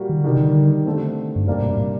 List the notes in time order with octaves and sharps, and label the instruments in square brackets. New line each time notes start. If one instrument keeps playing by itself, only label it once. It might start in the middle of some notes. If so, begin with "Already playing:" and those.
Already playing: [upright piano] A#2 G3 A#3 F#4
[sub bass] D#3
D3
[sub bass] C3 [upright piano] D#3 G3 D4 G4
[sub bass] D3
[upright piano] D3 A3 C4
[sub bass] G2
[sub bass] F#2 [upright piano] C3 G3 A#3 D4
[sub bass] A2
A2